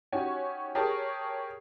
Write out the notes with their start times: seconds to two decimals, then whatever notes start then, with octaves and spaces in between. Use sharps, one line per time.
0.12 C#4 D#4 F#4 G4 C#5 G#5
0.75 G4 G#4 A#4 C#5 A5